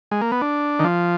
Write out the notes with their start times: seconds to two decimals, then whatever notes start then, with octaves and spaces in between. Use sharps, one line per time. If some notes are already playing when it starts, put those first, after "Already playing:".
0.11 G#3
0.22 A#3
0.32 B3
0.42 D4
0.79 D#3
0.84 F3